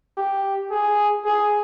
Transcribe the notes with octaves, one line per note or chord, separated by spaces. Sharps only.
G4
G#4
G#4